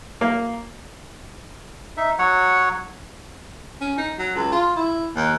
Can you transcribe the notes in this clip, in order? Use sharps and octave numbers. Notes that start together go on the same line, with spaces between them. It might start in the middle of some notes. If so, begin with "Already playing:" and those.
A#3
D#4 E5
F#3 C#5 F#5
C#4
D#4
F#3
C#2
F4
E4
D#2